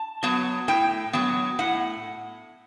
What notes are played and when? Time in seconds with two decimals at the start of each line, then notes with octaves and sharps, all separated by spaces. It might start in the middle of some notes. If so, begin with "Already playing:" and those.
Already playing: A5
0.23 F#3 B3
0.68 A2 G5
1.13 F#3 B3
1.59 A2 F#5